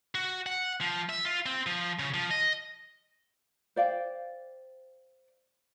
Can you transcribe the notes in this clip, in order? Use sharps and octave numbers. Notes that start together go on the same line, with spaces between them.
F#4
F#5
F3
E5
F4
C4
F3
C#3
F3
D#5
C5 D5 F5 G5